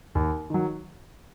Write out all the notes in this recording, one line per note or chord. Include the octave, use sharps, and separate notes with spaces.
D#2
D#3 F#3